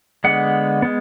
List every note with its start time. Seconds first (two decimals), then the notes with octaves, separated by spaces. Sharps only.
0.24 D3 G#3 B3 F#5
0.82 G#3 B3